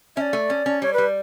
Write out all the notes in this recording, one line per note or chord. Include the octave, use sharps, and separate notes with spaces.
C#4 D5 E5
A3
C#4
C#4
G3 C#5
G3 B4